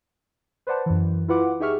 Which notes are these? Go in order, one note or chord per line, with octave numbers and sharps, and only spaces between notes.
B4 C5 D5 F#5 A5
F#2 E3
E4 F4 B4 F#5 D6
D#4 G4 G#4 E5 C#6 F6